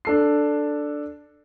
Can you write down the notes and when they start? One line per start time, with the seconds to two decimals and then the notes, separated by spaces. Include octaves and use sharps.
0.05 D4 A4 C7